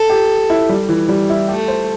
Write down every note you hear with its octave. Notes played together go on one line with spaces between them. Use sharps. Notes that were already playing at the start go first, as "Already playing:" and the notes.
Already playing: A4
G4
E4
G3
E3
G3
E4
A3 G4
C5